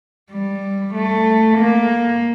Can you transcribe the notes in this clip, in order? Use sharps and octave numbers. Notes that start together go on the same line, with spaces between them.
G3
A3
A#3